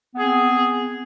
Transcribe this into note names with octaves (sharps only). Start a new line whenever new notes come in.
B3 C4 G#4